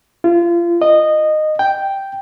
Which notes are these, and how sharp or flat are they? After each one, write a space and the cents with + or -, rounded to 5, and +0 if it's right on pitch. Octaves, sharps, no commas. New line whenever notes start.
F4 -30
D#5 -15
G5 +0